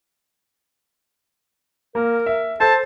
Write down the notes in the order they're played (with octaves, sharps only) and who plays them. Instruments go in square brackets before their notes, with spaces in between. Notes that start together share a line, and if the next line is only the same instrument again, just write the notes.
[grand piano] A#3 [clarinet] A#4
[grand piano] E5
[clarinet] A4 [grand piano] C5 [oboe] A5